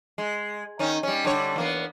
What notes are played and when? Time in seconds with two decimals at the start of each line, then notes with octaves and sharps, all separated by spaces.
0.18 G#3
0.79 D#3 C#4 D#4
1.03 G3 C#4
1.24 D3 G3 C#5
1.56 E2 A#3 B3